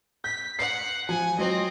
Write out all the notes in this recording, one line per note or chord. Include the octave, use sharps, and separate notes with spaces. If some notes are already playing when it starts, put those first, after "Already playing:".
G6 B6
F#5 C7
F3 G#5
F#3 C4 D#5